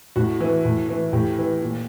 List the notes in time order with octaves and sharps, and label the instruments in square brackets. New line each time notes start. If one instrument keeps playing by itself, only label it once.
[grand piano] A2 F#4
E3
A2
E3
A2 G4
E3
A#2